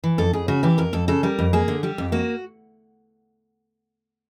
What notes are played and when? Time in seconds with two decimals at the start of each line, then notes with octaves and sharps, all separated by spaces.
0.04 E3
0.18 F2 A4
0.33 F2 G#4
0.48 C#3 F#4
0.63 E3 G4
0.78 F2 A#4
0.93 F2 A4
1.08 C#3 A4
1.23 G3 A#4
1.39 F2
1.53 A#3 G#4
1.68 D3
1.83 G3 G4
1.98 F2
2.12 A#3 F#4